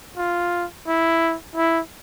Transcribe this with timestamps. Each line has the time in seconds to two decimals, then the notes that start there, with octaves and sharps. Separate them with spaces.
0.17 F4
0.87 E4
1.55 E4